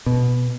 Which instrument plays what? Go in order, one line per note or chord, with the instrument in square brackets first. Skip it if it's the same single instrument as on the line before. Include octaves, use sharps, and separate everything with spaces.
[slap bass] B2